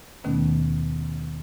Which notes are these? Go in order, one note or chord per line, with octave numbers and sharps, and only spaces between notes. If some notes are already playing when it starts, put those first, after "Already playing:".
D#2 B2 D#3 A3 B3 C#4